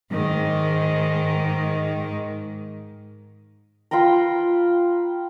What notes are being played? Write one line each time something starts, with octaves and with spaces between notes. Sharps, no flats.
G#2 D#3
F4 B4 G5 A#5